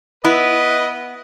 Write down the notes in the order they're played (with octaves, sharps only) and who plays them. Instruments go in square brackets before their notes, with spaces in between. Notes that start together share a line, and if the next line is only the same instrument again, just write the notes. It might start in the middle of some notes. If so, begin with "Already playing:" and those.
[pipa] B3 [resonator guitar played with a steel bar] E4 [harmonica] B4 [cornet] D#5